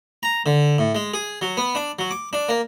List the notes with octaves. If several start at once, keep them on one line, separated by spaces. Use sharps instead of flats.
A#5
D3
A2
G#3
G#4
F#3
B3
D4
F#3
D6
D4
A#3